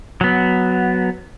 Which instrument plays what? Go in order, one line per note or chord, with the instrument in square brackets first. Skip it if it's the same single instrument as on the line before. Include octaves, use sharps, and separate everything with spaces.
[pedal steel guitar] F#3 B3